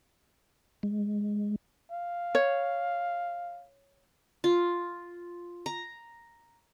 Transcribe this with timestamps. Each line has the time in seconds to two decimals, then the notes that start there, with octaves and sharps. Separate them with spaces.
0.83 G#3
1.92 F5
2.35 C#5
4.44 F4
5.66 A#5